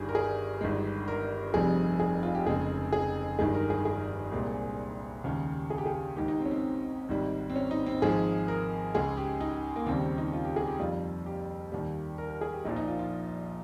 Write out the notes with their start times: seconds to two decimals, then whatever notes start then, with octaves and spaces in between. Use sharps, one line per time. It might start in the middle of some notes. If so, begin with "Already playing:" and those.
Already playing: G1 G2 D#3 G3 G#4
0.09 A#4
0.15 G#4
0.61 G1 G2 D#3 G#3
1.08 A#4
1.54 F1 F2 C3 G3 G#4
2.00 G#4
2.23 F4
2.35 G4
2.46 F1 F2 C#3 G#3 G#4
2.93 G#4
3.39 G1 G2 D#3 G#3 G#4
3.54 A#4
3.70 G#4
3.85 G#4
4.32 C2 A#2 G#3
5.24 D#2 C#3 G#3
5.70 G#4
5.78 G4
5.86 G#4
6.16 G#1 G#2 D#3 G4
6.28 D#4
6.40 C4
6.46 C#4
6.51 C4
7.09 G#1 G#2 G3
7.50 C4
7.56 C#4
7.71 D#4
7.86 C4
8.02 G#1 G#2 F3 G#3 G#4
8.48 A#4
8.94 C#2 C#3 G#3 G#4
9.17 G4
9.40 D#4
9.76 A#3
9.86 D#2 C#3 G3 C4
10.02 C4
10.18 D#4
10.33 F4
10.45 G4
10.56 G#4
10.68 G4
10.79 F2 D#3 G3 F4
11.26 G4
11.72 D#2 D#3 G3
12.18 A#4
12.30 A#4
12.41 G#4
12.53 G4
12.65 A#1 A#2 F3 D#4
12.76 D#4
12.88 F4
12.99 F4